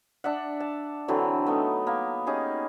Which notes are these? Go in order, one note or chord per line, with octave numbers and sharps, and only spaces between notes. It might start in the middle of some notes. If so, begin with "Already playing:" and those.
D4 D5 E5 F#5
A5
D3 E3 F#3 C4
A3 B3 D#4
A#3 B3
C#4 D#4 G4 G#4